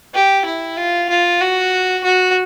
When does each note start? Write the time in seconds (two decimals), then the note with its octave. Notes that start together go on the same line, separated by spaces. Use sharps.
0.15 G4
0.45 E4
0.77 F4
1.10 F4
1.41 F#4
2.04 F#4